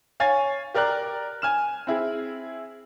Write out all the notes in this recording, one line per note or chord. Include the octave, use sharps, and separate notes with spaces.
C#5 F5 G#5 C#6 A6
G4 A#4 D5 F6 F#6
G#5 F6 E7
C4 E4 G#4